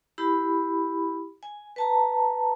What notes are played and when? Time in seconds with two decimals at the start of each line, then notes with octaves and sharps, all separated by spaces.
0.18 E4 G4 B5
1.43 G#5
1.76 B4 A5 A#5